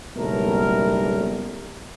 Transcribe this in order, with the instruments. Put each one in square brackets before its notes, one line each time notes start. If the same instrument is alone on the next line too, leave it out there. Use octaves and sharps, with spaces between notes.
[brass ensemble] F#1 B1 G3 A3 B3 A#4